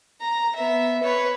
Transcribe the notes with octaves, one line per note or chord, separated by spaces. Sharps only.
A#5
B3 E5
B4 C#5